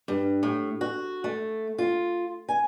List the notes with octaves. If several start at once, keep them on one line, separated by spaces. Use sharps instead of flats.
G2
A2
F#4
A3
F4
G#5